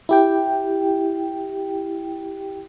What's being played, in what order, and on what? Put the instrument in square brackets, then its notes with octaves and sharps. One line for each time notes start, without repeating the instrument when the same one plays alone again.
[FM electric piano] E4 G4 G5